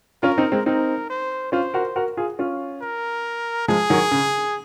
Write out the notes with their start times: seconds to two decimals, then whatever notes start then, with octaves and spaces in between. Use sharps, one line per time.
0.23 C#4 F4 A#4
0.38 C4 D#4
0.52 G#3 C4
0.66 C4 D#4 A#4
1.10 C5
1.52 C#4 F4 C5
1.74 F#4 A#4
1.96 F#4 A#4
2.17 F4 G#4
2.39 C#4 F4
2.82 A#4
3.68 F3 G#3 G#4
3.90 D#3 F#3
4.11 C#3